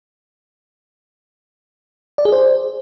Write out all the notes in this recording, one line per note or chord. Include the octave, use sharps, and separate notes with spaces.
D5
G#4
C5